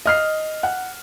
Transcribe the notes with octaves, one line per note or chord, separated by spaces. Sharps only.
D#5 F6 C7
F#5